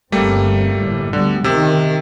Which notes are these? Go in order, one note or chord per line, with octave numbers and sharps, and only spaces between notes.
G1 G3 A3 A#3 C4
G1 A2
D2 D3 G3 B3
C3 D#3 E6